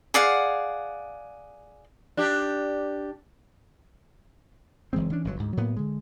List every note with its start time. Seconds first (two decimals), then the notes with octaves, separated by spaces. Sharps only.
0.14 G#4 D5 F5 F#5
2.17 D4 G4
4.93 F#1 E3 G#3 C4
5.10 E3 C#4 D4
5.25 G1 G#2 D3 F#3
5.36 D2 G#2
5.57 A2 F#3 A#3 B3
5.77 D3 G#3